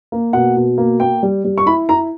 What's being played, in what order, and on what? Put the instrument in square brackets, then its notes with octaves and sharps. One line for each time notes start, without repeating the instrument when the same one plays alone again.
[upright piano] A#3
B2 F#5
B2
A#3
A#3 G5
G3
G3
C#6
E4 B5
E4 A#5